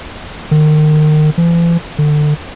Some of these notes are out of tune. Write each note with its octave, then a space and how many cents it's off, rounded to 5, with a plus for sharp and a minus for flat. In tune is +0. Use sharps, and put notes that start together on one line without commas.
D#3 -30
E3 +45
D3 +25